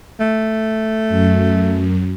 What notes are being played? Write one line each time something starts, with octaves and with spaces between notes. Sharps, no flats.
A3
F#2